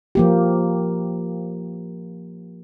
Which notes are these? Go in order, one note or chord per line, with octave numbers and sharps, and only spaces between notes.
F3 A#3 G4